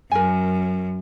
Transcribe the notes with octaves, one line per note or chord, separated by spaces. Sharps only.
F#2 A#4 G#5